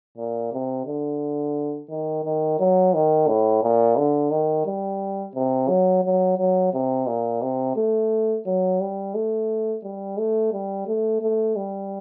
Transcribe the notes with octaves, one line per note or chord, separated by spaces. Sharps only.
A#2
C3
D3
D#3
D#3
F#3
D#3
A2
A#2
D3
D#3
G3
C3
F#3
F#3
F#3
C3
A#2
C3
A3
F#3
G3
A3
G3
A3
G3
A3
A3
G3